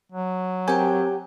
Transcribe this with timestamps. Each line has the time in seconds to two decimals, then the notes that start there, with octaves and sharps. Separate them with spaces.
0.12 F#3
0.68 C4 G4 A#4 G5 G#5